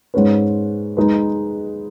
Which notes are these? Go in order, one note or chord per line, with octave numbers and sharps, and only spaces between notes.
G#2 G#3 C#4 B4
G#3 D#4 B4